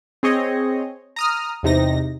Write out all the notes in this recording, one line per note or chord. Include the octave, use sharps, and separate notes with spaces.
C4 G#4 C#5 D#5
A#5 D#6 F6
E2 C3 D#4 A#6